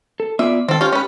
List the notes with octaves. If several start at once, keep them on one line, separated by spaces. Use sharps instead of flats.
A4
B3 F4 D5 E5
D#3 C4 A4
C#4 F4 G4
C#4 B4